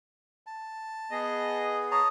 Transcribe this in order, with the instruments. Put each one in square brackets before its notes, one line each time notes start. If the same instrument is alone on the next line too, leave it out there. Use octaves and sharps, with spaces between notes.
[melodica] A5
[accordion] B3 G#4 [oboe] D#5
[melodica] C#5 A5 A#5 [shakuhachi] D#6